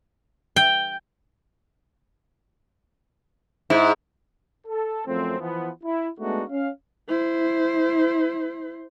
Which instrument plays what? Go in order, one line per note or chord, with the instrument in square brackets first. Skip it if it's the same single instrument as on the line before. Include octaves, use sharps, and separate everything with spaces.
[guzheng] G5
[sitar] G#2 [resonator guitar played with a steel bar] E4
[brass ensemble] A4
F#2 F3 A3 C4
E3 F3 B3
E4
G#3 A3 B3 D4 D#4 F#4
C#4 F5
[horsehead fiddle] E4 C5